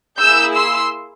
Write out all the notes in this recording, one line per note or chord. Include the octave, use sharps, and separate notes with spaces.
A#3 E4 G#4 E6 G6
C6 E6